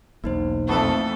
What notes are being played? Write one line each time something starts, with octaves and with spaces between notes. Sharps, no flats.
E1 B1 A#3 D#4 C5
F2 E3 A3 B3 A4